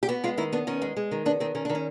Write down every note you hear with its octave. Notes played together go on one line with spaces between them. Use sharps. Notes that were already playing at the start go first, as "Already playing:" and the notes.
G4
B3 F#4
G#3 F4
D#3 E4
B3 D4
D#3 C#4
G#3
G#3
D#3
B3 D4
D#3 C4
D#3 C#4
D#3 D4
C#4